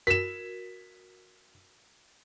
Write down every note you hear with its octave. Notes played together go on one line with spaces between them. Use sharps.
F#4 A#4 B6 E7